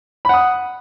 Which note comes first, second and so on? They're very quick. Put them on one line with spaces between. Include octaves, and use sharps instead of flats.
B5 F#5 D#6